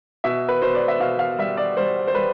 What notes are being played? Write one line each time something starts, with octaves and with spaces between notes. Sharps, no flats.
B2 E5
B4
B2 C5
D5
E5
B2 F5
F5
G3 E5
D5
G3 C5
C5
G3 B4